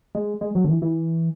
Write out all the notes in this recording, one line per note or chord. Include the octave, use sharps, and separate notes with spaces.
G#3
G#3
F#3
D3
E3
E3